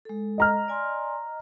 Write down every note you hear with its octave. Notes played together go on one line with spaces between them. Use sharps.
G#3 A4
D#5 A#5 F6
D5 G#5 C6